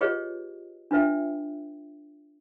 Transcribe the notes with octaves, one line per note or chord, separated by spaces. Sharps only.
F4 G4 G#4 B4 C#5 D#5
D4 F4 B4 E5 G5